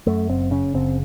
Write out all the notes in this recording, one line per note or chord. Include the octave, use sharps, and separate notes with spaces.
F#2 A3
F#1 C4
C#3 C#4
F#1 C4